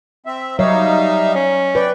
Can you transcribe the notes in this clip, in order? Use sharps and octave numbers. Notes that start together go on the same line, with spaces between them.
C4 E5
F#3 G3 D#4 C#5 E5 F5
C#4
B4 D5 G5